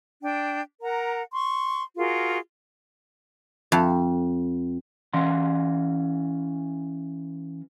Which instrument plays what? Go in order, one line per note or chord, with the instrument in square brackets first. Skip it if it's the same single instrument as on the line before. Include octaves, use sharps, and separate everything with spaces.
[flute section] D4 G5
A#4 F#5 A#5
C6 C#6
F4 F#4 G#4 A#4
[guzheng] F2
[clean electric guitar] E3 C#4 F5 F#5 C6